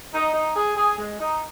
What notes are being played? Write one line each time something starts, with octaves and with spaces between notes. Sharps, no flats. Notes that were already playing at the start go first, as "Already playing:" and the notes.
D#4
D#4
G#4
G#4
G#3
D#4